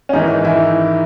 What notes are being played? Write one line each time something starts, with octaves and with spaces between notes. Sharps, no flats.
C#4
G#2 D#3 E3 D#4
E3 E4